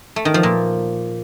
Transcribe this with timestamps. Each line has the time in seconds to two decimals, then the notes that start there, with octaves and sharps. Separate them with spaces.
0.16 A3
0.25 D#3
0.34 F3
0.43 A#2